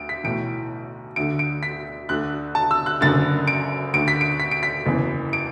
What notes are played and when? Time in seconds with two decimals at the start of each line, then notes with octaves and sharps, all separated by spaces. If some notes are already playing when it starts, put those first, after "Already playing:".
Already playing: D2 D7
0.09 B6
0.24 B1 A2 E3 D7
1.16 D2 D3 D7
1.39 D7
1.63 B6
2.09 D2 D3 F#6
2.55 A5
2.71 E6
2.86 F#6
3.01 F#1 F#2 D3 A6
3.47 D7
3.93 D2 D3 D7
4.08 B6
4.21 D7
4.40 B6
4.51 D7
4.63 B6
4.86 F#1 E2 E3
5.33 D7